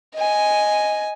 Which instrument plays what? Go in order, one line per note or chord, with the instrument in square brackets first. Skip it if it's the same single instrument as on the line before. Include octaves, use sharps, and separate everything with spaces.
[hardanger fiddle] D#5 G#5